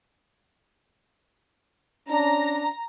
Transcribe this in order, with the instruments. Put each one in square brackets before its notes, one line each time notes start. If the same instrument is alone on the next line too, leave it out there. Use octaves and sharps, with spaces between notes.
[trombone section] C#4 D4 [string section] A#5